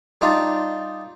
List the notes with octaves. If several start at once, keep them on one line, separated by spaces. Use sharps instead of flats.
G3 D4 D#4 F4